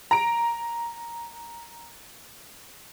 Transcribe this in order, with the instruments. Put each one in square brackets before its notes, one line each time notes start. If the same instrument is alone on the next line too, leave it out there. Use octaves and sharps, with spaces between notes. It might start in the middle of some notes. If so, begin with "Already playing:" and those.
[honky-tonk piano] A#5 D7